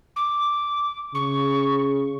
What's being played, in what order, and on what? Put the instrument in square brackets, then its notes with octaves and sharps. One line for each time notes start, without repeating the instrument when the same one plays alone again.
[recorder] D6
[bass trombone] C#3 [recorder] C#6